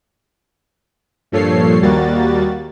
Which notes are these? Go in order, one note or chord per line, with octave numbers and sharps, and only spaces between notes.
G2 A#2 F3 A4 C#5 C7
D#2 G3 A#3 F#4 A6